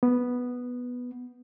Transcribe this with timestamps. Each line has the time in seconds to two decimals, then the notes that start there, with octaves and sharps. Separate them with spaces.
0.03 B3